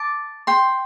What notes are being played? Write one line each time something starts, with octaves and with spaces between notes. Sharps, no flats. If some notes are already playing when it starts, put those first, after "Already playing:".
Already playing: A5 D6
G5 C6